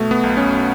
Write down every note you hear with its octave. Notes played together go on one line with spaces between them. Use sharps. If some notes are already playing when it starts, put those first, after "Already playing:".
Already playing: B2 A3
B3
B1
C#4